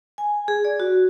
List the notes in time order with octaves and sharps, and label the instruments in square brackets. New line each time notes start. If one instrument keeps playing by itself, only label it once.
[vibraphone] G#5
G#4
D5
F#4